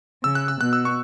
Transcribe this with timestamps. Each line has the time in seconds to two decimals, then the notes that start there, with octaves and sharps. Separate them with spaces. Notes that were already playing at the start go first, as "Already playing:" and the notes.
0.23 C#3 E6
0.35 F#6
0.48 E6
0.61 B2 F#6
0.73 E6
0.85 C#6